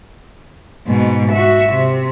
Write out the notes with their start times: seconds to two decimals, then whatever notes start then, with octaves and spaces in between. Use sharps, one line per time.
0.87 G#2 B2
1.33 F#4 E5
1.73 C3